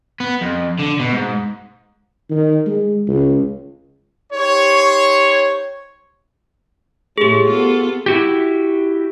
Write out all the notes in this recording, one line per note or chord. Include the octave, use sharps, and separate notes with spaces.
B3
F2
D3
B2
G#2
D#3
G#3
C#2
D#4 G4 C5 C#5
A2 G#3 G4 G#4
B3 F4 A4
E4 F#4 G4